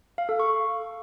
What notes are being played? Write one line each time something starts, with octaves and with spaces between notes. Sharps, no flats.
F5
A4
C#6